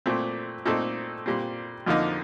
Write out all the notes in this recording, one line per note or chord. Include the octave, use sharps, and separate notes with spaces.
A#2 A3 C4
A#2 A3 C4 D#4 A4
A#2 G3 C4
F2 D3 F3 A#3 D#4